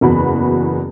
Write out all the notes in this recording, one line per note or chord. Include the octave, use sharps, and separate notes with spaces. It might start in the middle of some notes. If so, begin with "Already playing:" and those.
F#1 E2 F#4 B5